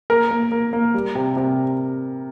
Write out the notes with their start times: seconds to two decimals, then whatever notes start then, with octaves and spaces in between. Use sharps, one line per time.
0.10 A#3 A#4
0.31 A#3
0.52 A#3
0.73 A#3
0.94 G3
1.15 C3
1.36 C3